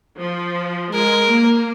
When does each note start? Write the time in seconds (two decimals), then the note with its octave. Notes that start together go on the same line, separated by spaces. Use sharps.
0.18 F3
0.93 G#3 A#4
1.30 A#3